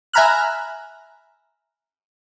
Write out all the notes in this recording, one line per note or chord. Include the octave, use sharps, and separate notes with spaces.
E5 G#5 A#5 B5 F6 F#6